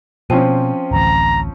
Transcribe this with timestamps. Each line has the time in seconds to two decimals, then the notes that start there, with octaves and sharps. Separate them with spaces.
0.30 B2 F3 C4 C#4 C5 G5 D#7
0.91 D1 A1 A#5